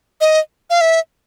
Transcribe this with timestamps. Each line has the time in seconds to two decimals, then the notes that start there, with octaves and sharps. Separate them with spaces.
0.21 D#5
0.70 F5
0.81 E5